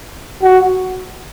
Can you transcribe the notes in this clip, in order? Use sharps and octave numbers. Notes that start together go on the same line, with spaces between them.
F#4